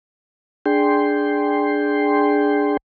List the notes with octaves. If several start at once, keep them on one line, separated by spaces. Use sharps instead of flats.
D4 G#4 G5 C6